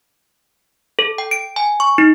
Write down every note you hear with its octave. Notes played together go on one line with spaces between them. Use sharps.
A4
G5
D7
G#5
C#6
D#4